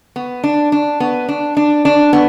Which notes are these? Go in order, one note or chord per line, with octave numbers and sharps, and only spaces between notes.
B3
D4
D4
B3
D4
D4
D4
B3